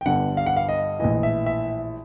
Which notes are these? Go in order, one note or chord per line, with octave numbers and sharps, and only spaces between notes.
G5
G1 G2 D3 F#5
F5
F#5
F5
D#5
A#1 A2 E3 D#5
E5
E5